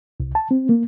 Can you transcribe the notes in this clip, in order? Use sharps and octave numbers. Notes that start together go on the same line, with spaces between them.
C2
A5
C4
A#3